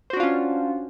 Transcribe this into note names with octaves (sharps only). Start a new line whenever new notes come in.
C#4 D4 F4 F#4 C5